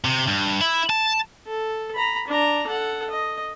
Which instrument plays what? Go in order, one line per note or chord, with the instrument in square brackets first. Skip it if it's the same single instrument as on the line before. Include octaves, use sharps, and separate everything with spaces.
[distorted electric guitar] C3
G2
E4
A5
[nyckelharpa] A4
A#5 B5
D4 A#5
A4 F#5
D#5